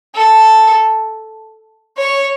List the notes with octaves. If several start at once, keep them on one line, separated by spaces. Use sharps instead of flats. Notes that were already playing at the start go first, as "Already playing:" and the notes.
A4
C#5